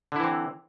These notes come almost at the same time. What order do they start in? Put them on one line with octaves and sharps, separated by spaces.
D3 E4 E3 C4